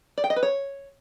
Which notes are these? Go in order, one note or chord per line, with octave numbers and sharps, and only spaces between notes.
D5
G5
D#5
B4
C#5